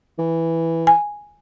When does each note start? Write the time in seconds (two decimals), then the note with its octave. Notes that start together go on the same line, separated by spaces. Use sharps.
0.18 E3
0.87 G#5